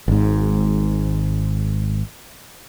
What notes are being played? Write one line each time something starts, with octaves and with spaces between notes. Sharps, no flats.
G#1 G#2